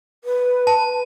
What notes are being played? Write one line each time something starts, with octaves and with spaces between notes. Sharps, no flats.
B4
A5